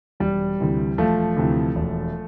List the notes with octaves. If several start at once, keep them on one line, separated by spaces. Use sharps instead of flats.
E1 G3
D2 C3 E3
E1 F3 A3
D2 C3 E3
E1